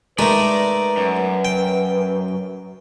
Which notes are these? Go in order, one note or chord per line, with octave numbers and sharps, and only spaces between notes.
G#3 A3 D#4 A#4 B4 D5
F#2
G5